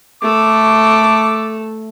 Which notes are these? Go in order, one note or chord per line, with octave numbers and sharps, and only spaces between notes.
A3 A4 D6